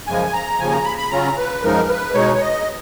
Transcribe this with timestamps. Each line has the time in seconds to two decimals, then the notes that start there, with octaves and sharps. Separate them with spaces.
0.07 F#2 C#3 F3 G#3 G#5
0.33 A#5
0.59 D#2 C#3 F3 G#5
0.72 A#5
0.85 B5
0.98 B5
1.11 C#3 F#3 C#4 F4 A#5
1.37 B4
1.63 F#2 F3 G#3 D#4 A#4
1.89 B4
2.14 B2 G#3 D#4 C#5
2.34 C#5
2.41 D#5